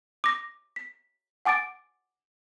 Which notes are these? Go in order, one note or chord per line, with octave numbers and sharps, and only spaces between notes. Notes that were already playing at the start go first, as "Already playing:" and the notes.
D6 A#6
B6
F#5 G#5 D6 A6 D7